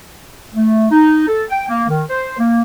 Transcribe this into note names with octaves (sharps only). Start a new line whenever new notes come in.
A3
D#4
A4
G5
A#3
D#3
C5
A#3